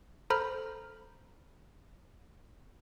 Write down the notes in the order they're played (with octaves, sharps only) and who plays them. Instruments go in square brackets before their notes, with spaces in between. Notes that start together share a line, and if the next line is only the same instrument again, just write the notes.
[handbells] A4 C5 A#5 B5 F6